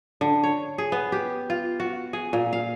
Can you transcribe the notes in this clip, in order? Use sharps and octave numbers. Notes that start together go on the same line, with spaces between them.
D3
C#5
G#4
B3
G4
F4
F#4
G#4
A#2
F5